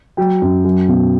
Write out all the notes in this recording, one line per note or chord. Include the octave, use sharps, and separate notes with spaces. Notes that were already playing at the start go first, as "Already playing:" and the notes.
F#3 G5
F#2
F#3
B2